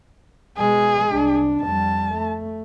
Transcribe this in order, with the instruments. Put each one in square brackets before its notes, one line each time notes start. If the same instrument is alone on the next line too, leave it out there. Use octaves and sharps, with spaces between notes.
[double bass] B2 G#3 [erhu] G#4
[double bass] C2 D4
[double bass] F2 G3 [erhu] A5
[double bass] A3